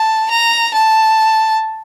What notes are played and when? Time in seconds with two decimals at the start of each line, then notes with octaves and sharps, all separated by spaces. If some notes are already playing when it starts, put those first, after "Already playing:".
Already playing: A5
0.30 A#5
0.74 A5